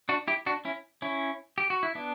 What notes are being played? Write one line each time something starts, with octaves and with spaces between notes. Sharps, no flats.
D4 F#4
E4 G4
D4 F#4
C#4 E4
C#4 E4
G4
F#4
E4
B3 D4